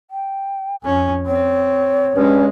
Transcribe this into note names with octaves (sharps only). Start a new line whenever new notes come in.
G5
F2 C#4 G#5
C4 C#5
G2 G#3 C#4